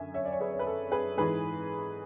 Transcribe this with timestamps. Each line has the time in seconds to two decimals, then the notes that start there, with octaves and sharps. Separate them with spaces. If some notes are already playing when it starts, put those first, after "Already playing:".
Already playing: F#2 D3 E5 G#5
0.14 C#5 E5
0.25 D5
0.32 C#5
0.40 G#4 B4
0.53 C#5
0.59 B4
0.67 A4
0.92 G#4 B4
1.17 G#2 E3 G#4 B4